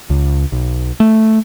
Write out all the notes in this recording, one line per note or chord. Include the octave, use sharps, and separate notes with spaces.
C#2
B1
A3